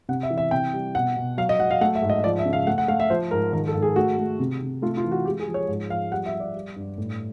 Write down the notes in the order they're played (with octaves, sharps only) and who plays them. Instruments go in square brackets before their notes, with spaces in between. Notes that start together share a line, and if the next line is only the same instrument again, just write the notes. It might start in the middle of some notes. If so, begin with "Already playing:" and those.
[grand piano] C3 F#5
E5
E3
E5
C3 G5
G3
B2 F#5
B2
F#3 F5
D#5
F#3 F#5
F5
A3 F#5
E5
G#2
D#5
F3 D5
E5
C#3
F5
A3 F#5
F#5
A3 F5
E5
F3 C5
G#2 A#4
D#3 A#4
A4
G#2
G#4
A3 F#4
A3
C3
C3
A3 F4
F4
E3
F#4
G#3 G4
G#4
F3
C#5
G#2
F3 F5
G3 F#5
E5
G3
D5
G3
G2
A2